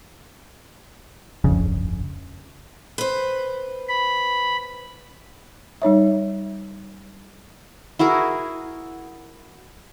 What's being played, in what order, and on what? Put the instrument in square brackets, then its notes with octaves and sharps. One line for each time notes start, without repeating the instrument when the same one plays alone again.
[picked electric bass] D1 G1 F2 C#3
[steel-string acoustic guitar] B4 C5
[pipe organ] B5
[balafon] G3 D#4 C#5 E5
[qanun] E4 F#4 G#4 A#4